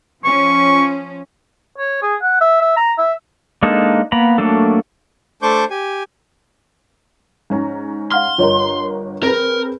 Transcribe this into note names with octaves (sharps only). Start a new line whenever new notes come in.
F3 C#4 C#6
C#5
G#4
F#5
E5
E5
A#5
E5
G#3 A#3 D4 D#4 A4
A#3 B3 A#5 B5
F#3 A3 A#3 D4 A4
A3 D4 C5 C#6 D6 G6
G4 G#5
G#2 C#4 A#5
F5 F#5 C6 F6
G1 F4 A#4 C#5 D#5
C4 G#4 A#4 B4